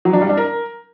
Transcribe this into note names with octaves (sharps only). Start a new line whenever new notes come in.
F#3
D4
G3
D4
A#4